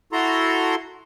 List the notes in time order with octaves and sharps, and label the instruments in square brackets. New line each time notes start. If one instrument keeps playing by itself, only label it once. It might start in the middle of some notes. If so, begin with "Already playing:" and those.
[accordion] E4 F#4 A4 A#5 C6